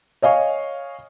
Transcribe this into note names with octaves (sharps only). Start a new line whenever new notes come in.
C#5 D#5 F5 G#5 C#6